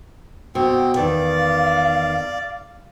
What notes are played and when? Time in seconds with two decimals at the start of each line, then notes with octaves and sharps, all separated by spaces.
0.55 B2 C4
0.96 E2 D#3 D5 F5